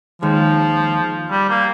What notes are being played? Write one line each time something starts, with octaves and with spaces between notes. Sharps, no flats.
D#2 D#3 F3 G#3
G3
A#3